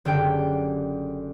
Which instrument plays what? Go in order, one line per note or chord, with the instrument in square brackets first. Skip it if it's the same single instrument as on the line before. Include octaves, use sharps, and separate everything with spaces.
[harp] F#1 D3 G4 G5